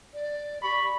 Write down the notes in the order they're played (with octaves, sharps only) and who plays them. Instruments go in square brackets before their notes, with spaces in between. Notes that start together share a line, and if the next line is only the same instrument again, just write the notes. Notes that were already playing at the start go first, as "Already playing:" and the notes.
[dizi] D5
[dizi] G4 [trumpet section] B5 C#6